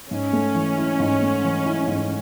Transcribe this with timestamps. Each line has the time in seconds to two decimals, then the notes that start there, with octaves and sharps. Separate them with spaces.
0.11 G#2 C#4
0.33 A3
0.55 E3
0.78 E4
1.00 G#2
1.22 A3
1.44 E3
1.66 E4
1.87 G#2